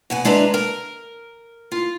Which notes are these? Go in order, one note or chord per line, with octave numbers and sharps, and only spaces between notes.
B2 F#5 G#5
G#3 D4 B4 E5 A#5
A#4
F4